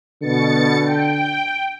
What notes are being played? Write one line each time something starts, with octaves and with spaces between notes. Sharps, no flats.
B2 D3 A6 C#7
G5